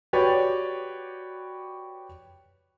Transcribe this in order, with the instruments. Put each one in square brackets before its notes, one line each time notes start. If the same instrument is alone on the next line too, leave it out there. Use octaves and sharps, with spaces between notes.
[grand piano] F#4 G4 B4 C#5 D5